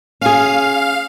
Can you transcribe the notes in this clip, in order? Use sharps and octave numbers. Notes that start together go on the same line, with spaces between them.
C#4 G#4 F5